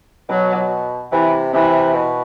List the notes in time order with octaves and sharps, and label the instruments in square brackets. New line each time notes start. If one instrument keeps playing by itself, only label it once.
[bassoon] B2 [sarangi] F#3
[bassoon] C3 [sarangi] E3
[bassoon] C3 [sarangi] E3
[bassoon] B2